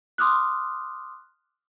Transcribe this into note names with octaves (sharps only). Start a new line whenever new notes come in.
C6 D6 D#6 F6 F#6